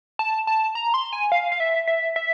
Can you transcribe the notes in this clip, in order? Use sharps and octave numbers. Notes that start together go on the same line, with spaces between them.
A5
A5
A#5
C6
G#5
F5
F5
E5
E5
E5